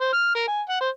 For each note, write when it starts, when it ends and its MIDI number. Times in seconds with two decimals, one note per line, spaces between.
0.01 0.13 72
0.13 0.32 89
0.35 0.45 70
0.47 0.62 80
0.69 0.80 78
0.81 0.89 72